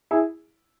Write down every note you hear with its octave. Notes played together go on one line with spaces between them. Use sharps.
E4 G#4